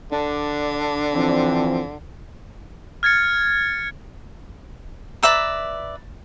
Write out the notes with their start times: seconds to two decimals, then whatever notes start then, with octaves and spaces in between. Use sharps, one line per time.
0.12 D3 D4
1.14 E3 F3 C4
3.03 F6 G#6 A6 C#7
5.23 B4 D5 E5 A#5